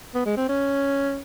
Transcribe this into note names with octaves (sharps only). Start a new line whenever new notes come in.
B3
G#3
C4
C#4